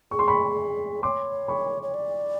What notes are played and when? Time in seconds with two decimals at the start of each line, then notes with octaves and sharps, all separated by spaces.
0.11 G#4 C#6
0.19 C6
0.28 B5 C#6
1.03 C#5 C6 D6
1.48 B5 C#6
1.83 C#5
1.94 D5